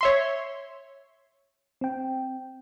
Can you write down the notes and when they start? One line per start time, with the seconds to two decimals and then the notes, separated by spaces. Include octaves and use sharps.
0.01 C#5 E5 C6
1.81 C4 G5